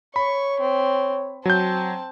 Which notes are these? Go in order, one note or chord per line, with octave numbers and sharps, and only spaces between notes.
C#5 B5 C#6
C4
F#3 C4 A5 G6